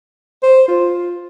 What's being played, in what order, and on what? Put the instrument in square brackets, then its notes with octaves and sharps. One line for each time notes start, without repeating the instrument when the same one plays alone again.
[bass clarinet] C5
F4